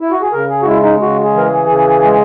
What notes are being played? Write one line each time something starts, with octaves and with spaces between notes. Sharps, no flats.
E4
F#4
G#4
C#3 A#4
G#4
F#4
G#3 E4
D#4
C#3 F#4
G#4
E3 A#4
G#4
C#3
G#3